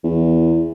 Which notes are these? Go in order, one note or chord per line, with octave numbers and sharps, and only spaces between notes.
E2